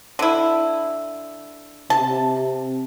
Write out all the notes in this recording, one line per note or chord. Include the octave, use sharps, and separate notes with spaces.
D3 E4
C3 A5